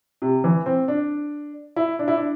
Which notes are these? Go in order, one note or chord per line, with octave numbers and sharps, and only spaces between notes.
C3
E3
C4
D4
E4
D4
E4
D4